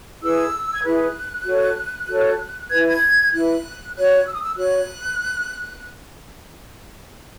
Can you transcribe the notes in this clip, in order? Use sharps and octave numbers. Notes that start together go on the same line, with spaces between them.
E4 G#4 B4 E6
G#6
E4 G#4 B4 F#6
F#4 A4 C#5
F#4 A4 C#5
E4 B4 G#6
G#6
E4 B4 F#6
F#4 C#5 F#6
E6
D#6
E6
F#4 C#5 F#6